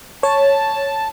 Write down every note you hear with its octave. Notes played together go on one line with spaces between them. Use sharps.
C#5 A5